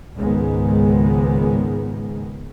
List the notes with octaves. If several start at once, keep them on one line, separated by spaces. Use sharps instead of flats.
C#2 G#2 D#3 G#3 B3